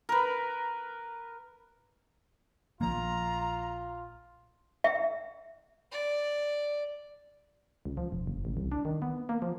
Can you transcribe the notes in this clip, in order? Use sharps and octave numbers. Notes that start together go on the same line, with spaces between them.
A#4 B4
A#1 F3 A#3 F4 A#5
E5
D5
C#2
F3
E1
F#1
A1
C2
D4
D#3
B3
A#3
F3